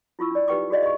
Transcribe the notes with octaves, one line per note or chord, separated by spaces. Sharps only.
E4 F4 C#6 E6
D4 D5
D#4 G4 B4 G5 C#6 D6
F#4 G#4 D5 D#5 F5
D#5 C#6